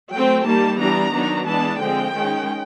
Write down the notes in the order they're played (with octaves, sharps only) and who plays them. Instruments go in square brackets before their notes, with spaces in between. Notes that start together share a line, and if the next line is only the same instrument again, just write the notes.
[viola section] F#3 A3 C4 G5
D#3 G3 A#3 A5
E3 G3 B3 D4 A#5
D#3 F#3 B3 D4
E3 G#3 B3 D4 A5
D3 F3 G#3 C4 G5
D#3 G#3 C#4